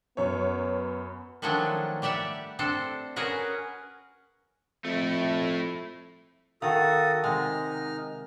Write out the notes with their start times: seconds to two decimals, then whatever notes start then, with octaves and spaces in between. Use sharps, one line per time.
0.17 F#2 B3 C#5
1.42 D#3 F3 F#3 A3 C#4 D4
2.02 G3 G4 D5 E5 F#5
2.59 C4 D4 A4 C5
3.16 C#4 F#4 G#4 A#4 B4
4.85 F2 A3 E4
6.62 D#3 F#4 A4 F5 F#5 D#6
7.24 C3 G#3 D#4 F#5 F6